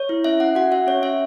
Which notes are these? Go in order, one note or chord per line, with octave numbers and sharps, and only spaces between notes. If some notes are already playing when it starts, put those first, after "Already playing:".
Already playing: C#5
E4
C#4 E5
C#4 F#5
F#4 F#5
F#4 E5
C#4 C#5
C#4 E5